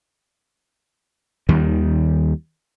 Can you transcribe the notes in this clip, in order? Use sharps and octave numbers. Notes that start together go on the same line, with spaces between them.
D#2 D#3 G3